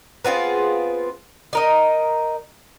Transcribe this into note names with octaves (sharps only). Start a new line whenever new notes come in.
B3 C4 F4 G#4
D#4 A#4 D#5